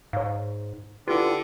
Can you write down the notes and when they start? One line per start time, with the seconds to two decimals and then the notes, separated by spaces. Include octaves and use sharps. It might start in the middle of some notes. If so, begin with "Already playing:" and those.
0.13 G#2 C#5 F5
1.08 D3 E4 F4 G4 B4